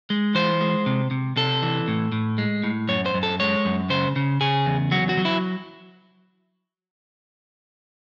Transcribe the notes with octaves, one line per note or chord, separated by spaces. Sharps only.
G#3
E3 C5
G#3
C3
C3
C3 A4
E3
A2
A2
G#3
A2
F#2 C#5
C5
F#2
A4
G#3 C#5
F#2
C#3 C5
C#3
C#3 G#4
E2
F#3 F#4
F#4
F#3
E4